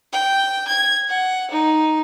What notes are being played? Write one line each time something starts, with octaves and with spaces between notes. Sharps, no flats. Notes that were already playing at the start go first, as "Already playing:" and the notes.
G5
G#6
F#5
D#4